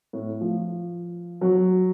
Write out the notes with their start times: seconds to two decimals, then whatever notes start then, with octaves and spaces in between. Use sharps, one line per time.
0.13 A2
0.41 F3
1.41 F#3